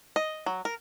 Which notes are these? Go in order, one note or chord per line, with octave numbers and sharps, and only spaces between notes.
D#5
F#3
A#4